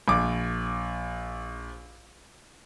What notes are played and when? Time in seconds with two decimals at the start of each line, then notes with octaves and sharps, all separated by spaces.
0.08 A#1 D6